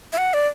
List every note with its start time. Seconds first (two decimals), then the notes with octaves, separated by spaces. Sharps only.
0.13 E5
0.18 F#5
0.34 D5